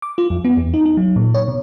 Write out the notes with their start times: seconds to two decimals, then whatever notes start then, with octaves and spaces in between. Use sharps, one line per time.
0.02 D6
0.18 F4
0.30 F2
0.45 B3
0.57 E2
0.74 D#4
0.86 D#4
0.97 F#3
1.16 A#2
1.34 C#5
1.48 B2